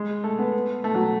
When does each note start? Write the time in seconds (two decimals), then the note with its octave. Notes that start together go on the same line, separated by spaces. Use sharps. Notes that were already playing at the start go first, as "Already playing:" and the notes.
Already playing: G#3
0.24 A3
0.39 B3
0.84 A3
0.95 F#3